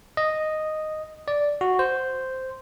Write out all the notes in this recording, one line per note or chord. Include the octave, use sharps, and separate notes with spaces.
D#5
D5
F#4
C5